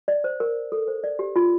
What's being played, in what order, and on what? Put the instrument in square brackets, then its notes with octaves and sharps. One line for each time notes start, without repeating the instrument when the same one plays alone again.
[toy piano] D5
C5
A#4
A4
C5
D5
G4
F4